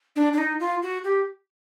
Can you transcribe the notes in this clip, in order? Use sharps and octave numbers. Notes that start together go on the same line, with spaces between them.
D4
D4
D#4
F4
F#4
G4